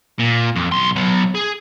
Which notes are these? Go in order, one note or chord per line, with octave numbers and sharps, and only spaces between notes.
A#2
F2
B1 C6
F#3 B3
G#4